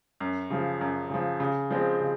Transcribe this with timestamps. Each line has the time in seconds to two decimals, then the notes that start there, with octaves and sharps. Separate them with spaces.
0.20 F#2
0.50 C#3 F3
0.81 F#2
1.10 C#3 F3
1.40 C#3
1.71 F3 G#3 C4
2.00 C#3